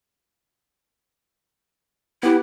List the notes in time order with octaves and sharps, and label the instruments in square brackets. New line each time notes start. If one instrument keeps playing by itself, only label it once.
[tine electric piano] B3 G4 B4 [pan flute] E4